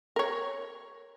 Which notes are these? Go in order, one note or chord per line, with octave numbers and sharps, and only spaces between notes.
A#4 C#5